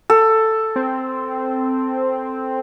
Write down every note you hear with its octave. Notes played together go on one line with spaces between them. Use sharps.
A4
C4